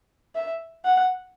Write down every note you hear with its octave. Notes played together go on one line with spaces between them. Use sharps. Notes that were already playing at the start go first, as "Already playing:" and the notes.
E5
F#5